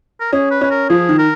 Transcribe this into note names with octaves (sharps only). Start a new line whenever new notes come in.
A#4
C#4 G#4
B4
C#4 B4
A#4
F3 G#4
D#3
A#4